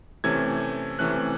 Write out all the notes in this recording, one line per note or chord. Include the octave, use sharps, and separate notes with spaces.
C3 E3 A3 C#4 G#6
C3 E3 A3 C#4 F#6